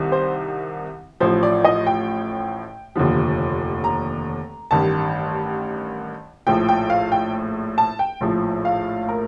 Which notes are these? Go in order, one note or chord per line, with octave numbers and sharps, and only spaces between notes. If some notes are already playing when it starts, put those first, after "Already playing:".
Already playing: C2 C3 D#3
C5
A1 A2 F3 C5
D5
D#5
G5
F1 D#2 D3 F3
A#5
A1 G2 D#3 A5
A#1 A2 F3 G5
G5
F5
G5
A5
G5
A#1 A2 F3
F5
A#4